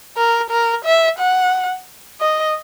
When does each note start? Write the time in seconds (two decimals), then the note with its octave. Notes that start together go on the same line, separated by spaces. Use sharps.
0.17 A#4
0.50 A#4
0.85 E5
1.19 F#5
2.20 D#5